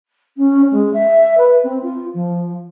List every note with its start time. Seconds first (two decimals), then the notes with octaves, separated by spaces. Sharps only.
0.37 C#4
0.71 G#3
0.93 E5
1.37 B4
1.63 C4
1.82 F4
2.13 F3